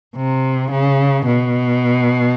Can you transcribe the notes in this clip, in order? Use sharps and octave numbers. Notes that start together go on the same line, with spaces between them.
C3
C#3
B2